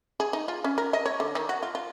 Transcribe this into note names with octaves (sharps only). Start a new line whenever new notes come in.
G#4
D#4
F4
C#4
A#4
D#5
C#5
D3
D#3
F#4
F4
F4